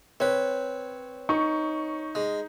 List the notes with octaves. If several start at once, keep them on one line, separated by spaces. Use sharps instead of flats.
C4 B4 C#5
D#4 C#6
G#3